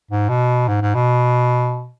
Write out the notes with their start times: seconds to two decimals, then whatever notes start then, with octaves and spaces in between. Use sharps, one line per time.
0.11 G#2
0.29 B2
0.68 G#2
0.82 G#2
0.95 B2